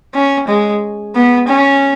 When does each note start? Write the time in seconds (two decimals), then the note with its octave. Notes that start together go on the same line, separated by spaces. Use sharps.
0.15 C#4
0.48 G#3
1.15 B3
1.48 C#4